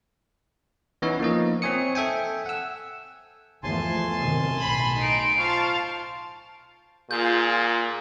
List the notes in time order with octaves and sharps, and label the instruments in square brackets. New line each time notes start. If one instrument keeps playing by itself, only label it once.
[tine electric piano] E3 B3 C#4 D#4 C#5
F3 A#3 D#4 D#5
C4 C#5 G#5 D#6 C#7
A4 E5 G5 G#5
F#5 E6
[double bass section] E2 F3 A3 [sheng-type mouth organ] G#5 A5 C6
[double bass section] F#2 C3 D#3
[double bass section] B1 A2 [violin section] B5
[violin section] D#4 D7
[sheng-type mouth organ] F4 C5 C#6 [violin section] F5 A5
[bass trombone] A#2 [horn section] F4 G#4 [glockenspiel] G6